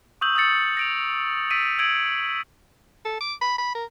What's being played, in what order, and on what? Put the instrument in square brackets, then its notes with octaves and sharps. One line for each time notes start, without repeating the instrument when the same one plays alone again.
[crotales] C#6 D#6 E6 G6 F#7
D#6 E6 G6 A6 C#7
A#6 D7 F7
E6 A6 B6 D7 D#7 F#7
E6 G#6 D7 F#7
[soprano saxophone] A4
D6
B5
B5
A#4